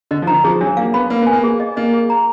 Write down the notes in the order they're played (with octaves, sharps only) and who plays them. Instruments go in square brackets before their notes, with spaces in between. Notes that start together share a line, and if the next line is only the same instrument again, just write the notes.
[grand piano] D3 [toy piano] D#5
[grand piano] F3
[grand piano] D#3 [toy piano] A#5
[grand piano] F3 [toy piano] G#4
[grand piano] F#3 [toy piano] D4
[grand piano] A#3 [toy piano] F5
[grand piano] B3 [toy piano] B5
[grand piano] A#3 [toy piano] B4
[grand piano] B3 [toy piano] G#5
[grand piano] A#3
[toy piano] G#4
D#5
[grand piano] A#3 [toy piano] D#5
[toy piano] G#4
A#5